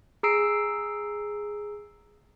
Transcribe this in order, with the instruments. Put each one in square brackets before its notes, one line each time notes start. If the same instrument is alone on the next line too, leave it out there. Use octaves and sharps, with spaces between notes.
[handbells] G#4 A#5 E6 C7 D7